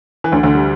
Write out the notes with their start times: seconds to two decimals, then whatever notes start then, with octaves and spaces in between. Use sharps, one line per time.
0.24 E3
0.32 D2 D3
0.43 D2 D3
0.55 G3